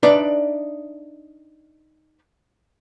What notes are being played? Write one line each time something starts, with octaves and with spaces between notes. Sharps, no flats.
D4 D#4 B4 D5 E5